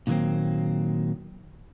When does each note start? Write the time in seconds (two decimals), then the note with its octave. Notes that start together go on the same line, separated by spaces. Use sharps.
0.07 A#2 D#3 F#3 A#3 C4